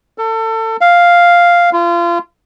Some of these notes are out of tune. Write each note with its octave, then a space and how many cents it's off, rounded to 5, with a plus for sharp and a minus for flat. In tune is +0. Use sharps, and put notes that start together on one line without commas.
A4 +30
F5 +0
F4 -30